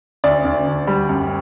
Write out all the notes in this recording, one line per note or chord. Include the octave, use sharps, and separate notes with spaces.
D2 D5
D2
D2
G3
F#2